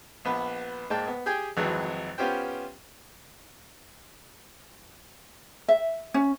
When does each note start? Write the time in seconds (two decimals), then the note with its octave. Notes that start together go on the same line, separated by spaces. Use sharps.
0.25 A#1 B3 B4
0.90 G#2 G#3 A#3 G5 A5
1.07 B3
1.26 G4 G#4 G5 G#5
1.57 G#1 F2 E3 F#3 G#3
2.18 B3 C#4 F4 G4 C5 G5
5.68 E5
6.14 C#4